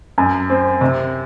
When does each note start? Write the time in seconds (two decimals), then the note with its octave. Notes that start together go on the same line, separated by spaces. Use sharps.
0.18 F#2
0.50 C4
0.81 C3